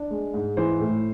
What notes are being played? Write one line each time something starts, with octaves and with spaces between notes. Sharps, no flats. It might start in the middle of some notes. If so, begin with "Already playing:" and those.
Already playing: D4
G#3
G#2
E3 C5
A2